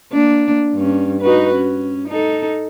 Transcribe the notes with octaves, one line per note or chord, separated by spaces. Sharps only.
A#3 D4
G2 C#4
D#4 F#4 B4
C#4
D#4 A4